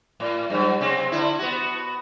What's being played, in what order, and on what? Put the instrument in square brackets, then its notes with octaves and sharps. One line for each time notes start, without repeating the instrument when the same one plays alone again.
[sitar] A2
G2 F#3
C3 C4
D3 E4
B3 F#4